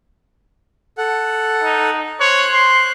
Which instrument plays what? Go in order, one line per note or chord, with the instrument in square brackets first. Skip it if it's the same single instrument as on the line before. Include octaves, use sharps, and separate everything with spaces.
[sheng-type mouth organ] A4 F#5
[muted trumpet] D#4
[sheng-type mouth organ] C5 F#6 [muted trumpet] C#5
[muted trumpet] C6